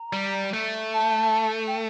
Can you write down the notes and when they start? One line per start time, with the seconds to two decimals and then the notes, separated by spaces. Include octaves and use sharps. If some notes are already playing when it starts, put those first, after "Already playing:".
Already playing: A#5
0.13 G3
0.53 A3
0.93 A5
1.67 G5